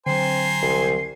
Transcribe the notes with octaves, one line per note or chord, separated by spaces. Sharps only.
D3 F#3 C4 C5 G#5 A#5 C7
C2